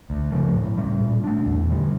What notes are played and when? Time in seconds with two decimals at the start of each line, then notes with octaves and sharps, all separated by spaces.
0.10 D2
0.32 C#3 F3 A3
0.54 A2
0.77 G3 C#4
1.01 A#2
1.24 A3 D4
1.46 E2
1.70 D3 G3